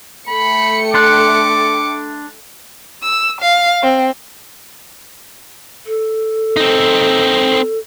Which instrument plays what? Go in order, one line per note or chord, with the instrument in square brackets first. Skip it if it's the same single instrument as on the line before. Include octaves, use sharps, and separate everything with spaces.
[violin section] A3 G5 C#7 [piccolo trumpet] B5
[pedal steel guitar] D4 C6 F#6 [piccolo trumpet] D6
[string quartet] E6
F5
C4
[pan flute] A4
[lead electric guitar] C4 D#4